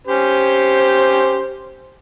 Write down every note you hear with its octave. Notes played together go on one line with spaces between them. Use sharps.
C#4 G4 C5